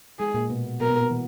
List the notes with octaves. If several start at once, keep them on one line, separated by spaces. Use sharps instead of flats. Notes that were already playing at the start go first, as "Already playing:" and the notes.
G#3 G#4
A#2 A#3
B2 B3
B2 B3 A#4
B2 B3
B2 B3
E3